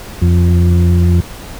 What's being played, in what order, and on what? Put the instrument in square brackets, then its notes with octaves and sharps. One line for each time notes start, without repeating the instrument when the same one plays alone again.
[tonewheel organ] F2